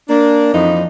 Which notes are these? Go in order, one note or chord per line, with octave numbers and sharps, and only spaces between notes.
A#3 D4
F2 E3 F3 D#4